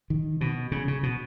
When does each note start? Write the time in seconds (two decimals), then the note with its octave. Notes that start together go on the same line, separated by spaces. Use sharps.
0.10 D#3
0.41 B2
0.72 C#3
0.88 C#3
1.03 B2